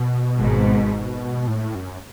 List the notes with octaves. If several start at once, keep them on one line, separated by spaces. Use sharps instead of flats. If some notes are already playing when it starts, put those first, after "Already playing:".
Already playing: B2
G#1 G#2
A2
F#2